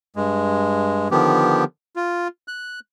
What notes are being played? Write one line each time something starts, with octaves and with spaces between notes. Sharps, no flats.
G2 G#3
D3 D#3 F3 B3 G4
F4
F#6